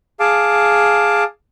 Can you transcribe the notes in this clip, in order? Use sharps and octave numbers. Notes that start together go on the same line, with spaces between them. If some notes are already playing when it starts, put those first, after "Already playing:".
G#4 F5 A5 D6